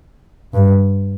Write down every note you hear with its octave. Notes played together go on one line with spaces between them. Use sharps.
G2